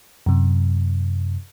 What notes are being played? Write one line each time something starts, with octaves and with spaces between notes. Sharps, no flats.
F#2 C3